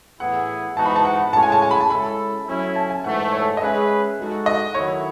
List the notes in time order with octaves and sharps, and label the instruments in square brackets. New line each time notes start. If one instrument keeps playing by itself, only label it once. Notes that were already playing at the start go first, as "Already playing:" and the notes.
[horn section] A2 E3 B3 E4 G#4 [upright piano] F#5
[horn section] G#2 E3 B3 D#4 F#4 [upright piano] A5
[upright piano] B5
A5
F#5
[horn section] A2 G#3 C#4 F#4 C#5 [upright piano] A5
[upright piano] G#5
A5
G#5
B5
A5
[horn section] G#3 C#4 E4 A4 [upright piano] B5
[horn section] F#3 A3 C#4 E4
[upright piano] A5
G#5
[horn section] G#2 E3 A3 [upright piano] F#5
[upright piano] C#5
A4
D#5
[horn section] G#3 C#4 G#4 B4 [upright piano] E5
[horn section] G#3 D#4 F#4 A4
[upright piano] D#5
[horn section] D#3 F#3 A3 E4 [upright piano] C#5